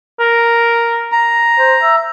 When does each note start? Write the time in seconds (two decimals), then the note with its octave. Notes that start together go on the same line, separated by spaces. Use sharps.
0.20 A#4
1.12 A#5
1.58 C5
1.82 E5